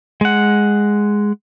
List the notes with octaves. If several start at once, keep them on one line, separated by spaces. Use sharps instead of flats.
G#3 F#5